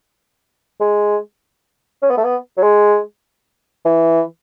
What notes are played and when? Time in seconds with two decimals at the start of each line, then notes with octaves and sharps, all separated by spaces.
0.80 G#3
2.02 C#4
2.10 B3
2.17 A3
2.24 B3
2.57 F#3
2.63 G#3
3.85 E3